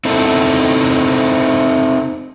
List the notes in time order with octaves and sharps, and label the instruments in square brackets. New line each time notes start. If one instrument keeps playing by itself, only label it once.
[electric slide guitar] C4 D#4 E4 A4